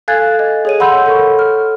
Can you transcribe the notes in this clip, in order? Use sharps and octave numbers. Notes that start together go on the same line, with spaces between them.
A4 F5 G#5 F#6 G#6 A6
D#5
G#4 C#5 D#7
F#5 B5 C6 E6 G6
A4 A#4 C#6
F6